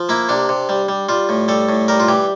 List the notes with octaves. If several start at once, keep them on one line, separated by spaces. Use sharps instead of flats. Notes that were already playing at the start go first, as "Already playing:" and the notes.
Already playing: F3
A#3 E4
C3 D4
C3
G3
G3
G3 F4
A2
G3 A4
A2
G3 A#4
F4
E3 G4